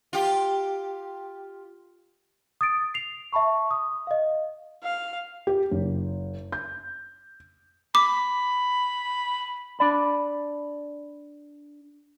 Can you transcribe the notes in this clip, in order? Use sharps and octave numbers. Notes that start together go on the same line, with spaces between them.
F4 G4
D#6 A6 D7
C7 F7
E5 A5 B5 C#6
D#6
D#5 F5
F5
G4
F#1
G6
B5 D6
D4 D5 B5